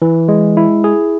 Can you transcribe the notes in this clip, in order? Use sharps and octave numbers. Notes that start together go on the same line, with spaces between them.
E3
G#3
E4
G#4